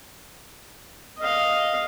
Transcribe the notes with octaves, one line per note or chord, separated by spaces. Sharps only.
D#5 F5